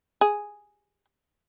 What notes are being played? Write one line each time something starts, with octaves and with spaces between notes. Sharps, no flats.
G#4